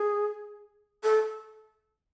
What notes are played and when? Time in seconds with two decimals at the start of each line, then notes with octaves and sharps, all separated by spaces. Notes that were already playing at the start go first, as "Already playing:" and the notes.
Already playing: G#4
1.03 A4